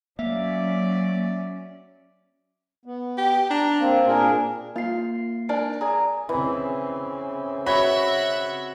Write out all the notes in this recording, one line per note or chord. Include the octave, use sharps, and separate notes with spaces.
F#3 A#3 C#4 D5 E5
B3
G4
D4 A#5
A#3 C4
A#2 D4 G#4 A#4
A#3 F4 C7
D4 A#4 G#5 A5
G#4 D5 G#5 A#5
C#3 E3 C4
F#4 C#5 E5 F#5 B5